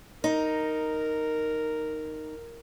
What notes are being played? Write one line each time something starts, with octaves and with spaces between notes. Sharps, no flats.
D#4 A#4